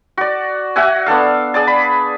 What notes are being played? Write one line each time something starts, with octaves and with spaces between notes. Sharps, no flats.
F#4 D5
F#4 E5 F#5 G#5
B3 D4 A4 F5
G#4 D5 A5
B5